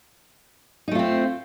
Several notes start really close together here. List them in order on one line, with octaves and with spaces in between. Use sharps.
D#4 A3 F4 C4